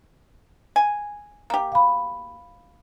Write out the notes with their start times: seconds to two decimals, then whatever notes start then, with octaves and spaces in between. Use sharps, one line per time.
0.76 G#5
1.50 A#3 G4
1.72 F5 B5